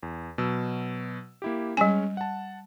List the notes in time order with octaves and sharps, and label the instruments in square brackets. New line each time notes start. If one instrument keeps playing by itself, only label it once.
[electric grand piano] E2
B2 F#3 E6
A#3 E4 G4
[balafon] G3 G#5 [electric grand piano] G#3 C#4
[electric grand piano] F#5 A5